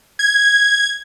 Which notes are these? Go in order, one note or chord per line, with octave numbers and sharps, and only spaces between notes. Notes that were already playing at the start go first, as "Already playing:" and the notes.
G#6